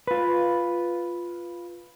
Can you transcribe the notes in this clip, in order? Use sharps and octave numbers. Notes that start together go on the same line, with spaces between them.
F4 B4